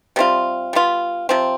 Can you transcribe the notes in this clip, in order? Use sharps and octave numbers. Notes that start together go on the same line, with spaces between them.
C3 G3 C4 F4
G3 B3 F4
C3 F3 C4